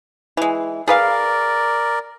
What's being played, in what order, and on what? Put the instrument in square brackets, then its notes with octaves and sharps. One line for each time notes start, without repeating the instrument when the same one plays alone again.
[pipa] E3 G#3
[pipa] G#4 B4 F5 [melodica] A#4 D5